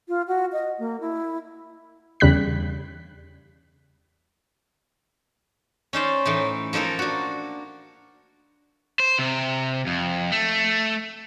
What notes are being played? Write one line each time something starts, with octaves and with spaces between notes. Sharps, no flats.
F4
F#4
D#5
A#3
E4
E2 C#3 G3 F#6 B6
C#4 D#4 C5 D5
A2 E3 D#4
F3 A#3 D#4 A4 A#4
D4 F#4
C5
C3
F2
A3